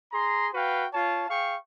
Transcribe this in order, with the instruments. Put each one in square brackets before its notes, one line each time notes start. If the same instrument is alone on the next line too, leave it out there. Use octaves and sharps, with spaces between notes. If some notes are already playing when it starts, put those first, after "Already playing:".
[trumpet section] G#4 A#5 C6
F#4 B4 F5 G5
F4 C#5 A5
G#4 F5 G5 C#6